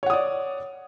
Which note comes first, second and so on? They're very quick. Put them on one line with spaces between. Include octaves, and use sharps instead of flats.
C#5 F#5 D#6 D5